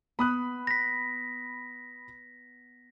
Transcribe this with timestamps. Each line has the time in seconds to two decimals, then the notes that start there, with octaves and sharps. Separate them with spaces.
0.19 B3 B5 D#6 F#6
0.67 A#6 B6